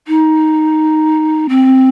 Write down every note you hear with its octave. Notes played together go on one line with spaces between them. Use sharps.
D#4
C4